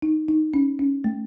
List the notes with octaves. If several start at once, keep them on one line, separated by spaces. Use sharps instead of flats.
D#4
D#4
C#4
C#4
A3